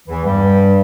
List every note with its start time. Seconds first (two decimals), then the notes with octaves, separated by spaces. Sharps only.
0.08 E2 E3
0.25 G2 G3